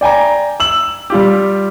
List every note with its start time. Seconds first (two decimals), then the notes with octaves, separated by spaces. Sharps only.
0.01 D5 G5 G#5 A#5
0.60 E6 F#7
1.10 G3 F4 G4